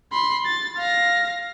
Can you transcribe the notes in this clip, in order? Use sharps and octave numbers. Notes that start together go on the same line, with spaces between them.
B5 C6
A6
F5 A#6